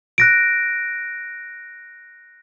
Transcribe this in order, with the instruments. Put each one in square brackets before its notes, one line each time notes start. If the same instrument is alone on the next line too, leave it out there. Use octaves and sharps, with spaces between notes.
[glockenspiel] F#6 A#6 D7